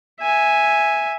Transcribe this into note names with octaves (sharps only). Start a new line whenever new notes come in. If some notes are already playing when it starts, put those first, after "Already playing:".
E5 G#5